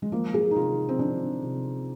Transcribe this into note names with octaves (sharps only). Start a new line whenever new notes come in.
G#3
F3 A#3
G#4
D#4
C3 F4
C4
F3 D4
C3